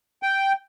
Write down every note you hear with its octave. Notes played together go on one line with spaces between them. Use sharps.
G5